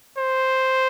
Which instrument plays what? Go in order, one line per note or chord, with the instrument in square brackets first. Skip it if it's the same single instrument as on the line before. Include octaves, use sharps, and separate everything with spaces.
[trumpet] C5